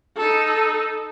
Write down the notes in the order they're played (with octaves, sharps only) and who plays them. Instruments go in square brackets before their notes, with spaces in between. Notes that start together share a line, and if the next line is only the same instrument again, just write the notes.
[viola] D#4 A4